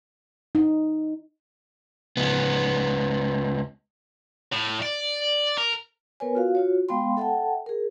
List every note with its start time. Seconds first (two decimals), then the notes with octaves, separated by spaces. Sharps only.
0.55 D#4
2.17 C#2 B3
4.53 A2
4.82 D5
5.58 A#4
6.20 B3 A#4 B4 C#5 G#5
6.35 F4 F#4 F5
6.55 F4 F#4 C#5
6.89 G#3 B3 F5 G5 B5 C6
7.17 A4 E5 F#5 G5 A5
7.66 G#4 A#4